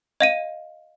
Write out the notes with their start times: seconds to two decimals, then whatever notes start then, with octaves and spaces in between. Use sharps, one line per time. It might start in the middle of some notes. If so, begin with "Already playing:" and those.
0.21 D#5 F5 D#7